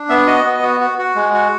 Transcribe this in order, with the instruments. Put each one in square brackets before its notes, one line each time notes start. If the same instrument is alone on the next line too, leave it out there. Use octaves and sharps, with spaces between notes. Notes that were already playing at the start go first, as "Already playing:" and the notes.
Already playing: [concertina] D4
B3 E5
F#4 D#5
B3
F#4
F#4
F#4
G#3
F#4